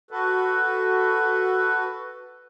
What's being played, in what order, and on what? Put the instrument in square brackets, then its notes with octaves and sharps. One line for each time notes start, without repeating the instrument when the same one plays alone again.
[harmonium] F#4 A4 B4